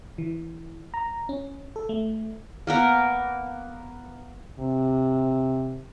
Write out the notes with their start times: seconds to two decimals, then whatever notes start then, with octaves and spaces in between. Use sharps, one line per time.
0.18 E3
0.94 A#5
1.29 C#4
1.76 A4
1.89 A3
2.67 A#3 B3 A#4
4.59 C3